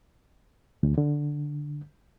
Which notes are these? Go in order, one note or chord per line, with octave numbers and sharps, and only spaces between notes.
D2
D3